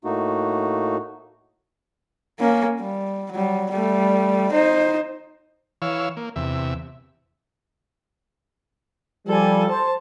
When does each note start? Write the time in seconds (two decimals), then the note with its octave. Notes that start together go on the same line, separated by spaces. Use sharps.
0.05 A2 A3 A#3 D#4 F#4
2.40 A#3 C#4
2.80 G3
3.32 F#3 G3
3.71 G3 A3
4.51 D#4 C5
5.82 E3 C#5 F5 E6
6.17 A#3
6.36 E2 C3 E5
9.28 F3 G3 A4 G#5
9.69 C5 A5